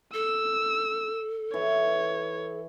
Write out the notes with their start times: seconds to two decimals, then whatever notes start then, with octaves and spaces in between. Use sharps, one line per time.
0.14 A4 E6
1.54 E3 C#5